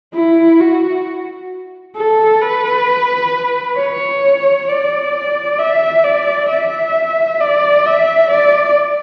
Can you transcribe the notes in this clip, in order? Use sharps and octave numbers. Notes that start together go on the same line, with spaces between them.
E4
F#4
A4
B4
C#5
D5
E5
D5
E5
D5
E5
D5